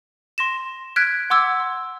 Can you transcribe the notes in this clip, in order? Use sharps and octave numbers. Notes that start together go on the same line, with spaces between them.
C6 A#6 E7
F6 F#6 G#6 B6 D7
F#5 C6 D6 E6 G#6
C6